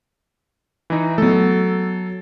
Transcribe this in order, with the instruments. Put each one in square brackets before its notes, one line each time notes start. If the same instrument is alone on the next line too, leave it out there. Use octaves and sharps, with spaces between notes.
[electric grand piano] E3 D#4
[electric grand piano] F#3 A4 [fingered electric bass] A3 B3